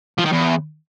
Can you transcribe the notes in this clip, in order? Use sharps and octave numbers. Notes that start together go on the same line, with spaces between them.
F3
D#3
E2